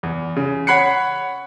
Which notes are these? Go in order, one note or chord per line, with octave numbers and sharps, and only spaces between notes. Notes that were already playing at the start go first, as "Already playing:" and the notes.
E2
C#3
C#5 F#5 B5 F#6 C7 C#7